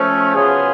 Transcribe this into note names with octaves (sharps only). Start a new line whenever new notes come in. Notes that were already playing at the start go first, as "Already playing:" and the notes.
Already playing: F3 A3 C#4
C#3 F#3 B3 F4 G#4